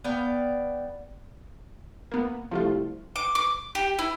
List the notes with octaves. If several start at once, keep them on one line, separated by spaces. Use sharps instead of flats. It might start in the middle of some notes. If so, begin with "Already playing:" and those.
B3 D5 F5 G5
A#3 B3
C2 F3 A3 F4
D6
D6
G4
E4